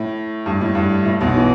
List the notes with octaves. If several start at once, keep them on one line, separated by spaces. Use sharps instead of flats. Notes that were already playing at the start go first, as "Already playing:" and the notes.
Already playing: A2
G2
A2
G2
A2
B1 B2
E3